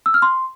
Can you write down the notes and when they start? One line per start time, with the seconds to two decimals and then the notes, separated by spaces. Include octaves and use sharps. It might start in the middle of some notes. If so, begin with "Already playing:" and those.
0.06 E6
0.14 F6
0.22 C6